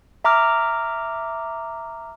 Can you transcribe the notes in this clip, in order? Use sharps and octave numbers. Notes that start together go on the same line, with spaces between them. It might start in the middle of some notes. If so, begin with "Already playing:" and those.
E5 A#5 D6 F6